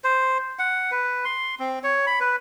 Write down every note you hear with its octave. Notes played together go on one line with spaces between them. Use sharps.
C5
F#5
B4
C6
C4
C#5
B5
B4